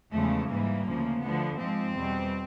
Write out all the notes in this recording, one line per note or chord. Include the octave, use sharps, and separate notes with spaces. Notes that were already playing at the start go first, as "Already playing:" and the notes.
E2 C#3 F3 G#3 A3
G#2 E3 G3 A#3
D2 C#3 F3
D2 D3 F3 B3
G#2 F3 G#3 C4
E2 B2 G3